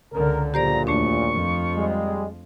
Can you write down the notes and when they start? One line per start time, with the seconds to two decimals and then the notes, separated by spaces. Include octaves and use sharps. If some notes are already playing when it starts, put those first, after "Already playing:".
0.13 C#2 D3 A#4
0.54 A#1 F#2 A#2 G4 C5 D5 A#5
0.87 D#2 A3 D4 C#6
1.34 F2 F3
1.76 G3 G#3